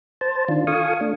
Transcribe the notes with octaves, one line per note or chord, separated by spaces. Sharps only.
C5 A5
D#3 D4 F4
F4 A4 F5 G#5 C#6 D#6
A3 D4